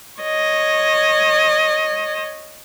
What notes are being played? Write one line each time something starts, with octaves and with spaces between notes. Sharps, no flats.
C#5 D#5